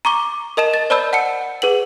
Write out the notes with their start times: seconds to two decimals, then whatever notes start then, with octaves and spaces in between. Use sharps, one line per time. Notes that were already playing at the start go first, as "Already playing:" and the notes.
0.05 A#5 C#6 D6 G7
0.57 A#4 D#5 A5 E7
0.74 A6
0.90 C5 D5 A5 B5 E6 G6
1.13 F#5 A5 C#7
1.62 G#4 B4 F#5 F#7